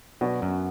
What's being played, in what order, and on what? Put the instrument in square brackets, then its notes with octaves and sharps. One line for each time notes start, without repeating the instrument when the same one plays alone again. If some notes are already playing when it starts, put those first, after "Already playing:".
[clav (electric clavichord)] B2 [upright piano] F#3 B3 D4 F#4 B4
[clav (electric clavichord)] F#2